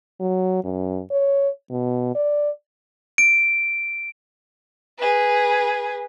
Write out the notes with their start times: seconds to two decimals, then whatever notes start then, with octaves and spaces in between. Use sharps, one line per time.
0.20 F#3
0.64 F#2
1.11 C#5
1.70 B2
2.15 D5
3.18 D7
4.98 G#4 B4